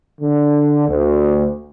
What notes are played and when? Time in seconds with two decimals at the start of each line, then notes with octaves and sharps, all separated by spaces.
0.21 D3
0.88 D2